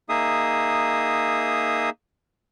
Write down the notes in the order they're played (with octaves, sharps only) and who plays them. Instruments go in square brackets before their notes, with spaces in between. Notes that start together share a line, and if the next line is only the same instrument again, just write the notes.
[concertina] A#3 D#4 G#4 E5 D#6